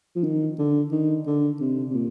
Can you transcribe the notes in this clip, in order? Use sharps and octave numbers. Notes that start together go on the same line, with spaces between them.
F3
D#3
D3
D#3
D3
C3
C3
A#2